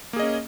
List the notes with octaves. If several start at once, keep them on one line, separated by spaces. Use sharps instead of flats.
A#3 C#4 G#4 D#5